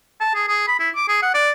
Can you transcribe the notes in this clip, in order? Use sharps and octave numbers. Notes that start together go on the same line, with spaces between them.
A5
G#4
G#4
B5
E4
D6
G#4
F#5
D5